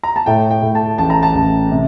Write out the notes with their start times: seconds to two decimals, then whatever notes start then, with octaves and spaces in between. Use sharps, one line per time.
0.03 A#5
0.16 A5
0.26 A2 G5
0.51 G5
0.62 A2
0.75 A5
0.98 A1 A5
1.10 A#5
1.23 A5
1.35 A1
1.71 C3